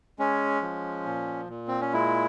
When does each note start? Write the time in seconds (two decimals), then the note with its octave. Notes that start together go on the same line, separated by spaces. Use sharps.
0.19 G#3 C#4
0.62 F3
1.06 A#2
1.49 A#2
1.68 C4
1.81 C#4
1.93 G#3 E4